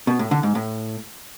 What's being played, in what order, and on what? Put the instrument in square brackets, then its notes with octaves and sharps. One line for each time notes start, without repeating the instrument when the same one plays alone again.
[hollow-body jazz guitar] B2
A2
D3
G#2
A2